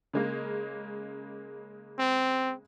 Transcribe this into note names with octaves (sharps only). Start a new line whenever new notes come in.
C#3 G#3 A#3
C4